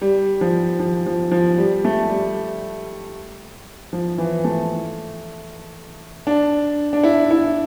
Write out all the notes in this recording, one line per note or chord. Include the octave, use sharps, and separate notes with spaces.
G3
F3
F3
F3
F3
G3
A3
G3
F3
E3
A3
D4
D4
E4
E4